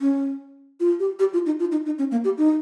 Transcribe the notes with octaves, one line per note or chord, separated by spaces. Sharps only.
C#4
F4
G4
G4
F4
D#4
F4
D#4
D#4
C#4
A#3
G4
D#4